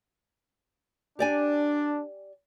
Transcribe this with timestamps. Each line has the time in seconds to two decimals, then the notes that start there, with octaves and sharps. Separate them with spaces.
1.19 D4 G4 D5 G#5